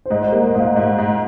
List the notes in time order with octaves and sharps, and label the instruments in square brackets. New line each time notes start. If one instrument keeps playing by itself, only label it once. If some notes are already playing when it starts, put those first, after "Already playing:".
[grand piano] C5
[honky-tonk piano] G#2 [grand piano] D#5
[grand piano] D#5
C5
[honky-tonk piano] A#3
[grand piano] D#5
[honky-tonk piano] G#2 [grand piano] D#5
[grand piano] F5
[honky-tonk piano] G#2 [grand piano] D#5
[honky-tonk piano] G#2